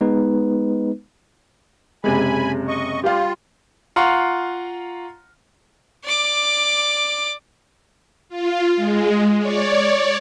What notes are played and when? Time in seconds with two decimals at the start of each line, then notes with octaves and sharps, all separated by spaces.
0.01 G#3 B3 D#4 B4
2.04 F#1 C3 G#3 G#5 B5
2.68 D#5 C#6
3.04 G3 F4 G4 F5
3.96 F4 F5 F#5 A#5 C6 C#6
6.04 D5 D6
8.29 F4
8.76 G#3
9.39 C#5 D5